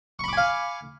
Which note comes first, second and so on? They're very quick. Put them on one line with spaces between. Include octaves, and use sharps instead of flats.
C#6 B5 D6 G#5 F5